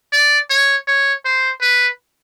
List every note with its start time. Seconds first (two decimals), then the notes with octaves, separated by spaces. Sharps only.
0.13 D5
0.50 C#5
0.88 C#5
1.25 C5
1.62 B4